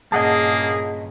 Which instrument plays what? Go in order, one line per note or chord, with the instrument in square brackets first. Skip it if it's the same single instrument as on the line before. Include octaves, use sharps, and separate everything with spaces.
[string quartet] G2 A#2 C#3 [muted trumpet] A#3 [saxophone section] G#4 [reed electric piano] D#5 F#5 A5